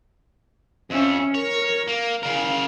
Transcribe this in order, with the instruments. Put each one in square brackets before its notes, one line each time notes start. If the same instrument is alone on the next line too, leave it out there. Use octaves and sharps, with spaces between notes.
[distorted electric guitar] F2 [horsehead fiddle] C#4 E5
[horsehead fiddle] A#4 [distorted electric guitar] C#5
[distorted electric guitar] A#3
[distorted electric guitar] C#3 A#4 [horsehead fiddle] F5